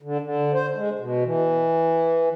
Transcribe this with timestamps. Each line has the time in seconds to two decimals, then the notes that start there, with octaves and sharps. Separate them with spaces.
0.02 D3
0.21 D3
0.53 C5
0.75 G#3
0.99 B2
1.24 E3